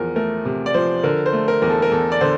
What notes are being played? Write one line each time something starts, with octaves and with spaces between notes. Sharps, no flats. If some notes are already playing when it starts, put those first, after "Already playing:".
Already playing: E2 F3 A#4
A3 A#4
C3
D5
F3 C5
D3 A#4
C5
A3
A#4
E2 A#4
A4
A#4
E2 A4
D5
D3 C5